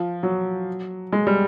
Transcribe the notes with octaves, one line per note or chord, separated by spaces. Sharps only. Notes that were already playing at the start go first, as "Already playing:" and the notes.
Already playing: F3
F#3
G#3
G3